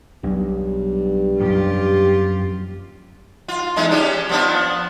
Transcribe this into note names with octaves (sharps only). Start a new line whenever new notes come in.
B1 G2
F#2 A#2 F3 F4 G4
F4
E2 G#3 D#4
C#4 D4 G4
F3 B3 D4